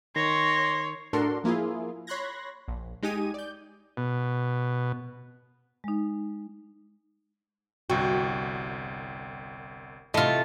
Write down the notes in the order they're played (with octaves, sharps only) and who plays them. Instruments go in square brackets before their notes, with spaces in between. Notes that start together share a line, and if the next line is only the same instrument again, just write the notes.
[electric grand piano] D#3 [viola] C#5 [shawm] C6 [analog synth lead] A#6
[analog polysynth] A2 D4 F#4 A4 A#4 C6
F3 A#3 E4 F4 G#4
C#5 B5 C6 F#6 G#6 A#6
A#1
G#3 D#4 G4 G#5 D#6 D#7
D5 G6
[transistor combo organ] B2
[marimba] G#3 D#4
[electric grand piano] G1 C2 G5 [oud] F#4
[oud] C3 E4 [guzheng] A3 F4 [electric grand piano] D#5